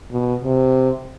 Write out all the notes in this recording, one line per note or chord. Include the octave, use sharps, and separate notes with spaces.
B2
C3